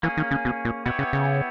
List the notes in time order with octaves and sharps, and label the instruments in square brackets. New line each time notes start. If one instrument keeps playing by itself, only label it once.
[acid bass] E3 [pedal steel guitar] A#3 C#4 G#4
[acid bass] D#3
C#3
B2
A#2
[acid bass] B2 [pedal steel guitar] B3 E4 G4 C#5
[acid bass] C#3
C#3